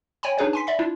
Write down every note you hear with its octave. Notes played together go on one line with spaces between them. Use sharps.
C#5 G5 G#5 B5
D4 D#4 G#4 B4 C#5
G#5 C6 B6
D5 E5 B5 B6
D4 E4 F4